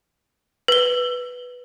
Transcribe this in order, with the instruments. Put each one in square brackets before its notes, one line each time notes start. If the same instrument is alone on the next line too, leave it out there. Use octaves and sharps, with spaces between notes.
[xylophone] B4 G7